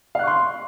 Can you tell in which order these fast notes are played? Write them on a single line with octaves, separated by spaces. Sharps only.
F5 F#6 C#6 C6